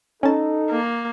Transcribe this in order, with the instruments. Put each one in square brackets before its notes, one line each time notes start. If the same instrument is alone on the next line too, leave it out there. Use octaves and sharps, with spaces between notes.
[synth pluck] C#4 A5 [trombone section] D#4 A4
[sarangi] A#3